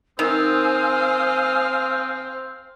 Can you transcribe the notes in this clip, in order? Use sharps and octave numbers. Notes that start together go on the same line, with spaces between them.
D#3 C4 C5 F5 G#5 D#6 E6